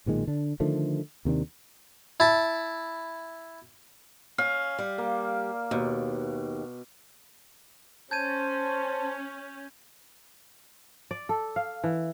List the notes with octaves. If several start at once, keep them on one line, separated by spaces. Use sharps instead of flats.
B1 A#2 D#3 G#3
D3 D4
D3 D#3 F3 A3
D#2 C3 D#3 D4
E4 A5
C#4 F5
G3
A#3
D#2 B2
C#4 C5 A5 G6 G#6 D#7
D5
A4
F5
E3